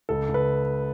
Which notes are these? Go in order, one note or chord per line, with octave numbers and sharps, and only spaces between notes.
C#2 A4
C#2
B4